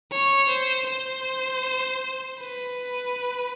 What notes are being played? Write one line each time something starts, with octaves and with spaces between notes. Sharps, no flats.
C#5
C5
C5
B4